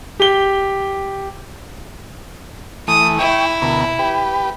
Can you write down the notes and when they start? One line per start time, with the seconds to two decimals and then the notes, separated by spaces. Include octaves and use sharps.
0.20 G4 G7
2.88 E3 A3 D#6
3.19 E4 G5 C#6
3.62 D2 B2 A#4
3.99 G4 B4